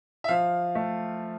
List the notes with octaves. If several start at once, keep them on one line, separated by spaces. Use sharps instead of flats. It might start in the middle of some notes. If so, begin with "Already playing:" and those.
E5
F3 F5
A3